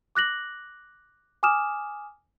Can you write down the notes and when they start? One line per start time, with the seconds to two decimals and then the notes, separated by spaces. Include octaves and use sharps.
0.15 D6 F#6 A#6 F#7
1.43 G#5 D6 D#6 F6 E7